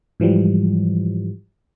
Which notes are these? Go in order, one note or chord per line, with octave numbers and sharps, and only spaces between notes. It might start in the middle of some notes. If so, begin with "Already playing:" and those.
G#2 E3 F3 G3